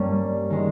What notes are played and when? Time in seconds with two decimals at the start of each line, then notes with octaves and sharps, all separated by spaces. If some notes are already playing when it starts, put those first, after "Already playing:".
Already playing: G2 G3 A#3 C#4
0.50 D#3 G#3